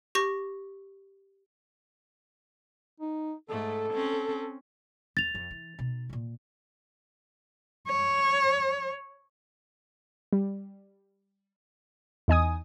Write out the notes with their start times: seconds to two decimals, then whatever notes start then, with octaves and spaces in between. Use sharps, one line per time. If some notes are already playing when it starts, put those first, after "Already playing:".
0.15 G4 C#6 A#6
3.00 D#4
3.49 G#2 A3 A4
3.93 C4 C#4
5.17 D#2 A6 F7
5.34 F2
5.51 E3
5.79 B2 D#4
6.09 A#2 D#3
7.87 C#5
10.33 G3
12.28 E2 D#4 G#5 D#6